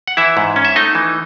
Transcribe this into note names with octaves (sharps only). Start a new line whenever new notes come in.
F#5
E3 E4 E5
G#2
C#4
E5
A3 D#4 D#5
E3